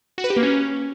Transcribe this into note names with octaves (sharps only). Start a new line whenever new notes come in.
F#4
B4
G4
A#3
C#4